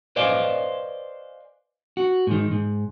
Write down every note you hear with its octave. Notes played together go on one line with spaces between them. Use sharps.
B4 C5 D5 D#5 F5 G#5
F#4
G#2 D#3
G#2